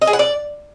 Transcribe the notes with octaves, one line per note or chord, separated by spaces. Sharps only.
D#5
G#4
F#5
D5